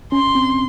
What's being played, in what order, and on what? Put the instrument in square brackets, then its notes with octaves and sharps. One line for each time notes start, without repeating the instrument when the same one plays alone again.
[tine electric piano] C#4 [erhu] C6
[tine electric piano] C4